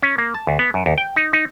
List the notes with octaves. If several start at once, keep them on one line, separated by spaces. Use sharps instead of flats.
C#4
A#3
A5
D2
B3
F#2
D#2
G5
D#4
D#4